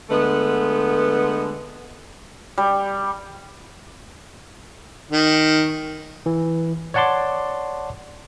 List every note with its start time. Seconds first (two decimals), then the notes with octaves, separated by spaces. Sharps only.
0.10 D3 G#3 A3 B3
2.58 G3
5.11 D#3
6.26 E3
6.94 C#5 D5 F#5 A5 C6 D6